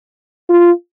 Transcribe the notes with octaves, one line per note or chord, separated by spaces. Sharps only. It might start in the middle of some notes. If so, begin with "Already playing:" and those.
F4